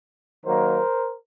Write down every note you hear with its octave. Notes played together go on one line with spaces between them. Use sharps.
D#3 F#3 A#3 A#4 C5